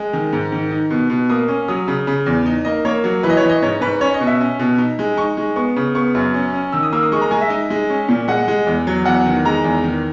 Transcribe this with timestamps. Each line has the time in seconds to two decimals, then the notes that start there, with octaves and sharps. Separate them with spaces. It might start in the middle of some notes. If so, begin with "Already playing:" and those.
Already playing: G#3
0.13 D#3
0.33 G#2
0.52 D#3
0.70 D#4
0.90 B2
1.10 B2
1.29 A#3 D#6
1.48 C#4
1.68 F#3 D#6
1.88 C#3
2.07 C#3
2.26 E2
2.46 D#4
2.65 A#3 D#5
2.85 A#3 C#5
3.04 F#3
3.23 E3 B4
3.30 D#5
3.37 C#5
3.42 E3
3.49 D#5
3.62 G#2 C#5
3.81 G#2 B4
4.01 C#4 C#5
4.14 D#5
4.20 B2
4.27 E5
4.41 C#4
4.59 B2
4.78 D#4
4.99 G#3
5.17 D#4 C#6
5.37 G#3
5.56 B3 C#6
5.76 C#3
5.95 B3 C#6
6.15 F#2
6.34 C#4
6.53 C#4
6.72 D#3 E6
6.83 D#6
6.92 A#3 E6
7.03 D#6
7.12 G#3 C#6
7.21 A#5
7.31 G#3 G#5
7.41 E5
7.50 D#4
7.70 G#3
7.90 C#4
8.09 A#2
8.28 G#3 F#5
8.48 G#3
8.67 E2
8.87 F#3
9.05 E2 F#5
9.26 D#3
9.45 G#3 A#5
9.64 E2
9.84 D#3